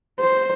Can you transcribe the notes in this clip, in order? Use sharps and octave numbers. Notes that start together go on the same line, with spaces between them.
C5